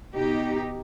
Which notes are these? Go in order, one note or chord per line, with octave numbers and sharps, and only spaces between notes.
B2 D#4 G4